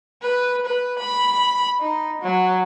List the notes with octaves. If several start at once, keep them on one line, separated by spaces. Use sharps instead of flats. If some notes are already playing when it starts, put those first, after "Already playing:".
B4
B4
B5
D#4
F#3